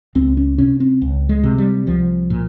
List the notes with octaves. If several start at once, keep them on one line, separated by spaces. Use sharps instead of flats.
C#2 C4
C#4
C3 C#4
C4
C#2
G#3
C3
G3
C2 F3
A#2